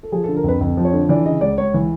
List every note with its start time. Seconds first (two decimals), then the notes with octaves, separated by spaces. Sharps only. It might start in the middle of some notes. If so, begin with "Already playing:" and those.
0.03 A4
0.12 F3 G#4
0.24 A4
0.28 D3
0.36 A#4
0.44 F2 B4
0.61 F2
0.77 F3
0.85 C#5
0.93 D3
1.09 E3 D5
1.26 C#3 D#5
1.41 C#2 D5
1.58 C#2 C#5
1.74 E3